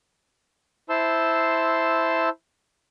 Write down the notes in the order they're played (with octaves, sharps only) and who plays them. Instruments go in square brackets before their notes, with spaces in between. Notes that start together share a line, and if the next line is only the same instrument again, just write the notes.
[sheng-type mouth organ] E4 C5 A5 C6 E6